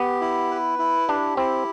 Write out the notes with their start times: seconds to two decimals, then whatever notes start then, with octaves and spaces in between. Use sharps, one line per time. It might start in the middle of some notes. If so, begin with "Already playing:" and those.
Already playing: B3 G4
0.21 E4
0.51 B4
0.79 E4
1.08 D4 G4
1.37 C4 E4